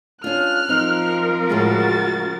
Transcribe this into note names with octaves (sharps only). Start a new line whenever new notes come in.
C#4 D4 F4 F6 F#6
F3 C4 D#4 A#4
A2 C#3 G#3 F#4 A6